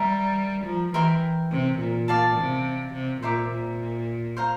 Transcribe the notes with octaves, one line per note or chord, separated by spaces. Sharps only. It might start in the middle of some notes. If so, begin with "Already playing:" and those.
Already playing: G3 A#4 E5 A#5
F3
E3 A#4 E5 G5 C6
C3
A#2
D5 F5 A5
C3
C3
A#2 C5 E5 A#5 D6
A#2
C5 F5 A#5